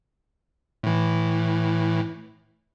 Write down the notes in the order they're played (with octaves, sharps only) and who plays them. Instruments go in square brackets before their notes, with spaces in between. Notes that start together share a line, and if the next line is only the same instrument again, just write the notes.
[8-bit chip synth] A2 E3